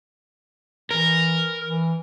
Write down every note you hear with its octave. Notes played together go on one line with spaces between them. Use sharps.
E3 A#4
E3